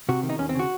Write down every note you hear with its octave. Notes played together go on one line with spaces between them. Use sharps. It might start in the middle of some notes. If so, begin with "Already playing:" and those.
C3 F#4
D#3
D#4
D#2 C#4
C4
C#3 F#4